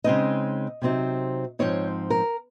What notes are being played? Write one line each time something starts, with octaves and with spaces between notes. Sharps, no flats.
C#3 G#3 C4 D#4 D#5
C3 F#3 C4 D#4
G#2 F3 C4 D#4 C#5
A#4